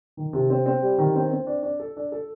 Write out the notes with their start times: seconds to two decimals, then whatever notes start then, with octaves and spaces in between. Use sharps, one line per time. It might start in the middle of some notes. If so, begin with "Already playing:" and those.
0.17 D#3
0.33 C3
0.50 C4
0.66 C4
0.82 G3
0.98 D#3
1.15 C4
1.31 C4
1.47 D4
1.63 D4
1.80 A4
1.97 D4
2.12 A4